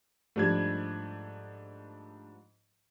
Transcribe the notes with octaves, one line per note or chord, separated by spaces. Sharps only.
G#2 F3 G3 A3 D4 G#6